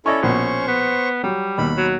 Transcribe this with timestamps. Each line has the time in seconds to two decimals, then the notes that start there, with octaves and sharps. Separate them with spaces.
0.06 C#4 E4 A4 D5 D#5 C#6
0.23 A#1 B2 C5 C#6
0.67 B3
1.23 F#3 G3
1.58 D#2 B2 B5
1.77 F#3